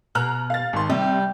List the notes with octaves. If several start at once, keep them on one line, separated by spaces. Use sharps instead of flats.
B2 A#5 F6 F#6
F5 A6
G#1 C6
C3 G3